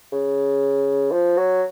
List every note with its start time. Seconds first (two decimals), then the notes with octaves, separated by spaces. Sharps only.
0.12 C#3
1.12 F3
1.37 F#3